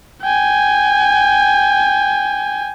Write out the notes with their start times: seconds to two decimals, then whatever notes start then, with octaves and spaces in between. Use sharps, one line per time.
0.22 G5 G#5